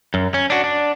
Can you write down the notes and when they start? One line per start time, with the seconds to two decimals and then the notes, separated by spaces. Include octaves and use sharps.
0.14 F#2
0.34 C#4
0.50 D4 F#4
0.64 D4